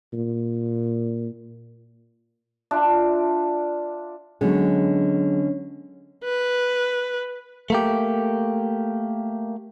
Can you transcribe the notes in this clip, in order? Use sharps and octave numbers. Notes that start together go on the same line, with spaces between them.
A#2
D4 F4 E5
D3 F#3 G#3 B3 C#4 G#4
B4
A3 A#3 G4